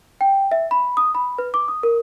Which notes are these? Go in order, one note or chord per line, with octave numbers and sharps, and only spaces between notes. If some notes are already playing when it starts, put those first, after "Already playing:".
G5
E5
B5
D#6
B5
B4
D6
D#6
A#4